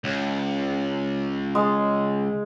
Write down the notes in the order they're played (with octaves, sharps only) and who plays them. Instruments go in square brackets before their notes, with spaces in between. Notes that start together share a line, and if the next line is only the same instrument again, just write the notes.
[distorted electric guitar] C#2
[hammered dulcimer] G#3